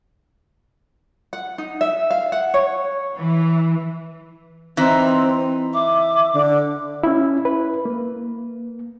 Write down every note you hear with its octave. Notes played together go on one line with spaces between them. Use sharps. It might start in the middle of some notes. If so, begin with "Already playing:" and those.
F#5
D#4
E5
F5
F#5
C#5
E3
E3 C4 D#4
E5 D6
D3
C#4 E4
B4
A#3